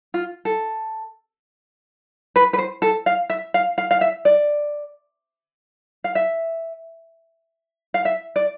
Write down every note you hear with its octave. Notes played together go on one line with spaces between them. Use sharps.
F4
A4
B4
B4
C5
A4
F5
E5
F5
F5
F5
E5
D5
F5
E5
F5
E5
D5